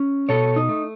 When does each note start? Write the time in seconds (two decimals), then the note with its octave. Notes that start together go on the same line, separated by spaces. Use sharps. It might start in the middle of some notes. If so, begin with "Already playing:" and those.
Already playing: C#4
0.29 B2 A4 C#5
0.56 D#4
0.69 A3